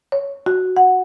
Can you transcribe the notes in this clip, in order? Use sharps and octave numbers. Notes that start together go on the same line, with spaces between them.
C#5
F#4
F#5